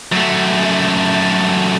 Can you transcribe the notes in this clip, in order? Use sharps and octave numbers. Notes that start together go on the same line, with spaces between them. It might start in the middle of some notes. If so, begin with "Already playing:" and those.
F#2 A3